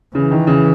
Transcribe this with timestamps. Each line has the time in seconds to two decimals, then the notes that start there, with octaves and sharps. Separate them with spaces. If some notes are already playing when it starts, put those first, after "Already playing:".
0.15 C#3 E3
0.31 D#3
0.47 C#3